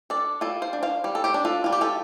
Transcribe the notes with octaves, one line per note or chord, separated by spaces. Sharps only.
D4 A4 D5
G3 F4 A4
C5 F5
D4
C5 F5
G3
A4
G4 C5
D4
F4 A4
G3 F4
G4
F4 A4